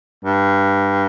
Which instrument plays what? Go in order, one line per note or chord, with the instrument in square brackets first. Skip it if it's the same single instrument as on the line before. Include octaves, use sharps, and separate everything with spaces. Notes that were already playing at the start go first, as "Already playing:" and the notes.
[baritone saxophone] G2